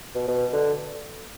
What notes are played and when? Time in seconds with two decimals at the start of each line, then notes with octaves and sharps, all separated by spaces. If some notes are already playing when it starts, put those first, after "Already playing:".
0.15 B2
0.28 B2
0.53 D3